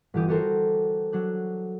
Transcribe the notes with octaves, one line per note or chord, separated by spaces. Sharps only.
G1 E3 G4 D#6
F#4 G4 A4 A#4 C5
F#3 D4 F#6